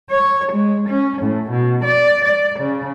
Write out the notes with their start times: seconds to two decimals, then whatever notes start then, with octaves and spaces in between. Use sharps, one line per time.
0.10 C#5
0.52 G#3
0.88 C#4
1.21 A2
1.50 B2
1.84 D5
2.24 D5
2.59 C#3